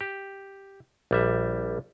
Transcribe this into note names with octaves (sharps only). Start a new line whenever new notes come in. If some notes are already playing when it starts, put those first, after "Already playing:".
G4
A#1 G3 E5